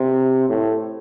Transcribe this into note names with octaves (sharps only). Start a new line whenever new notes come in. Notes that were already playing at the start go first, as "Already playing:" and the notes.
Already playing: C3
A2